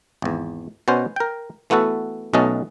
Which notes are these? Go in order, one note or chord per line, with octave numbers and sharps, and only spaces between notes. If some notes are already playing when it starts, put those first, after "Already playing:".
G#1 E2
B2 B3 C#4 C5
A#4 G5
E3 A3 B3 F#4 A4
B1 B2 A3 C#4 D#5 A5